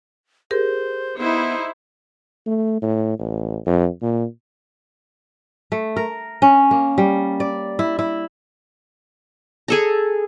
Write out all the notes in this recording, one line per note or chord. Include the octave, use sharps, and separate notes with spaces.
G4 G#4 A#4 C5
B3 D#4 E4 C5
A3
A2
A1
F2
A#2
A3
A#4
C#4
A#3
G3
D5
E4
E4
G#4 A4 A#5